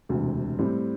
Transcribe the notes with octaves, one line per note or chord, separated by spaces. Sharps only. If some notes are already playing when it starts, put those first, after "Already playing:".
E1 D2 C3
A2 G3 C4 E4